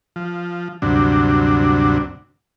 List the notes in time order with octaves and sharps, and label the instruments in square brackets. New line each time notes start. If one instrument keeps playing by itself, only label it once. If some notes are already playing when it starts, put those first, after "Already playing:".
[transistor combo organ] F3
D2 G2 C3 F#3 D4